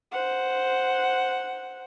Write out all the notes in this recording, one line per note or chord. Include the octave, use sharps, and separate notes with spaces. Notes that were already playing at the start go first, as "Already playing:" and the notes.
C5 F#5